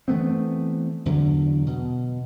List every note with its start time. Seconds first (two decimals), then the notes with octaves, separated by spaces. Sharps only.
0.08 E3 A3 B3 C4
1.06 E2 D3 F#3
1.67 B2